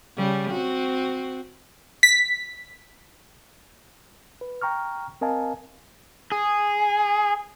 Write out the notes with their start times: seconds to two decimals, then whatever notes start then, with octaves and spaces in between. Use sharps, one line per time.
0.17 C#3 G3
0.51 C4 F#4
2.03 B6
4.41 B4
4.62 G5 A#5 C#6 F6
5.21 C4 A#4 D#5 F5 G#5 A5
6.32 G#4